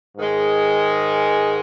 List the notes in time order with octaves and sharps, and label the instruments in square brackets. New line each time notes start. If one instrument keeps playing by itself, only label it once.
[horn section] G#2 D#3 G#3